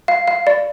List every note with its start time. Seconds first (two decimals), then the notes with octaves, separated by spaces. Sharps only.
0.08 F5
0.28 F5
0.47 D5